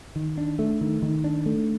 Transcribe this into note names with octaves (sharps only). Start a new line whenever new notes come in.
D#3
D4
A3
D#3
D#3
D4
A3